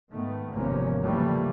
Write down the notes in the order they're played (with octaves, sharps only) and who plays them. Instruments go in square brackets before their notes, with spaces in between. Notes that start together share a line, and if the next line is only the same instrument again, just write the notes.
[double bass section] G#2 D#3 A3 B3
G#1 E2 C3 F3 A#3 C#4
C#3 E3 F3 G3 A3 A#3